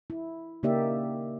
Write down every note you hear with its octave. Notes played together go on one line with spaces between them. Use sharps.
E4
C#3 A#3 D#4 G4 D5 E5